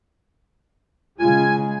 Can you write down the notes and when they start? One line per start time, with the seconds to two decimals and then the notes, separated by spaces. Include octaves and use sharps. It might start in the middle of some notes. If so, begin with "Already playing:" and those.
1.19 C#3 G#3 F4 G#5